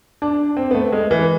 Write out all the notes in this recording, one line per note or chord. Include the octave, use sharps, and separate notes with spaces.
D4
C4
B3
A3
G#3
E3